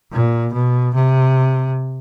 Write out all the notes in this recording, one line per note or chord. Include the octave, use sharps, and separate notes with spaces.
A#2
B2
C3